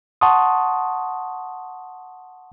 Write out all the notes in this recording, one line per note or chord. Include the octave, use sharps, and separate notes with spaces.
F#5 A5 C6 C#6 D#6